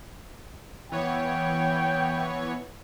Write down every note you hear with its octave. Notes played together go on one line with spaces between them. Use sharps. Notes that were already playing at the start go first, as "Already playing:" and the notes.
E3 B3 C#5 G5